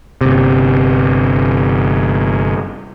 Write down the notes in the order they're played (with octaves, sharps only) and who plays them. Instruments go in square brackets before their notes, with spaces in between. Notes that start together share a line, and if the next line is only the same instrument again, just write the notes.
[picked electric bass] G1 C3